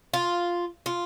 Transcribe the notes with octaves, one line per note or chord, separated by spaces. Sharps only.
F4
F4